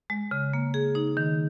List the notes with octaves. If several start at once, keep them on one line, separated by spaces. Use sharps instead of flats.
G#3
C#3
A#3
G#4
D#4
D#3